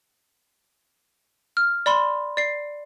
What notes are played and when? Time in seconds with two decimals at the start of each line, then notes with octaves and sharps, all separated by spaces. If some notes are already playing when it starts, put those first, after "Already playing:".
1.57 F6
1.86 D5 B5 C6
2.37 D5 C7